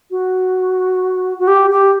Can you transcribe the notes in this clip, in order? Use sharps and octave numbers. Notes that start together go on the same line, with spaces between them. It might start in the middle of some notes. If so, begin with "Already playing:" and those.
F#4
F#4
G4
G4